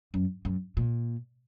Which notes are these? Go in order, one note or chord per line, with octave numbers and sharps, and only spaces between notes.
F#2
F#2
A#2